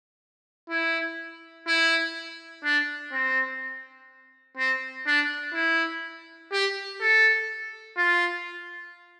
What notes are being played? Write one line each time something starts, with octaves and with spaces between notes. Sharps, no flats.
E4
E4
D4
C4
C4
D4
E4
G4
A4
F4